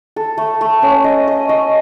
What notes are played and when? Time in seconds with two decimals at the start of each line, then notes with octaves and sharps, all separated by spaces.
0.16 A4
0.38 A3
0.61 A3
0.82 C#4
1.04 D#5
1.28 D#5
1.49 D#5